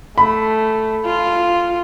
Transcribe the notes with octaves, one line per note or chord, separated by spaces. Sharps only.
A3 B5
F4